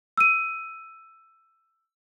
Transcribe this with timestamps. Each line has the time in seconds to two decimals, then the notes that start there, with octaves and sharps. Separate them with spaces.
0.17 E6 D#7